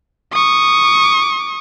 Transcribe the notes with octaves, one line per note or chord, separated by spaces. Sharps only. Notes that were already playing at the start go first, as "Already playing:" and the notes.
C#6 D#6